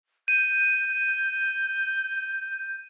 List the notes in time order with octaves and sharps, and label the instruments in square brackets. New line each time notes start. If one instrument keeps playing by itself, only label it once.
[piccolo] G6 [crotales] D#7